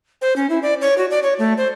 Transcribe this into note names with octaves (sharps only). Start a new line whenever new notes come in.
C5
C#4
E4
D5
C#5
F#4
D5
C#5
A3
C5